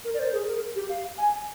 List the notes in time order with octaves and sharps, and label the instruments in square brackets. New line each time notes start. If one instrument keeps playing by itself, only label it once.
[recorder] A#4
D5
C5
A#4
G#4
A#4
G4
F5
G#5